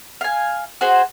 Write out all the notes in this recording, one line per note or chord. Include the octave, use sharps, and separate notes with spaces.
F5 G#5
F#4 G#4 C5